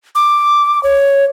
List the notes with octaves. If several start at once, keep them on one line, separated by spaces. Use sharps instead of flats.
D6
C#5